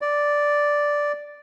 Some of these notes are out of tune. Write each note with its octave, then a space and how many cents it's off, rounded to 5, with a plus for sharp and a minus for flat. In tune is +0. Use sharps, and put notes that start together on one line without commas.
D5 -5